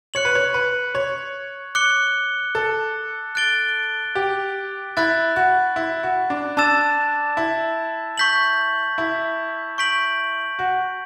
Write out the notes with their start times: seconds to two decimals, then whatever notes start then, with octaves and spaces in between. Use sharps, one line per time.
0.14 C#5 F#6 C#7 F#7
0.25 B4
0.35 C#5
0.54 B4
0.95 C#5
1.75 D6 F#6 C#7 G7
2.55 A4
3.35 F#6 A6 D7 G7
4.15 G4
4.97 E4 B5 F#6 A6
5.36 F#4
5.76 E4
6.03 F#4
6.30 D4
6.57 D4 A5 E6 A6 E7
7.37 E4
8.18 C#6 G6 B6 F#7
8.98 E4
9.78 C#6 G6 B6 D7 F#7
10.59 F#4